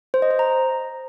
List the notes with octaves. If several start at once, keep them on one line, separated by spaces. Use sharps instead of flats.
C5
D#5
C5
A#5